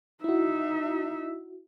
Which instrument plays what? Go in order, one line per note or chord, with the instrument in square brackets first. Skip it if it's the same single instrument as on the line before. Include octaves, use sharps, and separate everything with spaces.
[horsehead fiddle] D#4 E5 [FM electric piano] E4 F#4